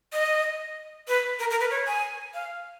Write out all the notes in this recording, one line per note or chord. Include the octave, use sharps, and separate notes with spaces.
D#5
B4
A#4
A#4
B4
C#5
G#5
F5